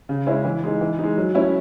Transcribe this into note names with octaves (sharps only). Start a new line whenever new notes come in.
C#3
G#3 C#4 E4
E3
G#3 D#4
E3
G#3 D#4
F#3
A3 C#4 E4